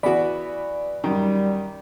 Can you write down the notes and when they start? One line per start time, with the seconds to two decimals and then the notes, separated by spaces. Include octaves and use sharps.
0.03 E3 B3 F#4 D5 B5
1.04 F#2 D#3 G3